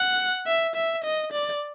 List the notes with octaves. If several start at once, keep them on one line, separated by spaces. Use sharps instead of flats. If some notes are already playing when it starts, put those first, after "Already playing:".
Already playing: F#5
E5
E5
D#5
D5